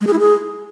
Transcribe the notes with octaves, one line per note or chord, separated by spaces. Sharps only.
G#3
G#4
E4
G#4